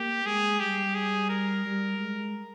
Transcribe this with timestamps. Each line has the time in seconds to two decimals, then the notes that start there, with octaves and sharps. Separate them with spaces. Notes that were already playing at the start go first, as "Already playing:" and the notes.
Already playing: A#3 G4
0.26 G#3 G#4
0.60 G3 G4
0.95 G#4
1.30 A#4
1.65 G3
1.99 G#3